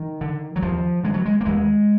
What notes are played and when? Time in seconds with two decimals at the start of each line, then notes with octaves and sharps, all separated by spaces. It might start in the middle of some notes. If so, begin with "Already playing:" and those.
Already playing: D#3
0.21 D3
0.56 F#3
0.62 D#2 F3
1.03 D3 G#3
1.14 F#3
1.25 G#3
1.41 A#3
1.45 D#2 G#3